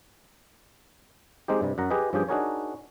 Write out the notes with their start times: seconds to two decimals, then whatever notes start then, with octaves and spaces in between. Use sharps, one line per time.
1.48 G#3 C4 D#4 G4
1.61 G2 C3 G3
1.78 F#2 F#5 A#5
1.90 G4 G#4 B4 D#5
2.13 G2 F3 C#4 G4 G#4 G5
2.29 D4 D#4 F#4 G#4 A#4 C#5